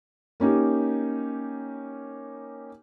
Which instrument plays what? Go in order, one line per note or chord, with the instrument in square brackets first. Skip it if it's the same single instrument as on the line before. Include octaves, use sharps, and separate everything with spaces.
[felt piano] A#3 C#4 D#4 G4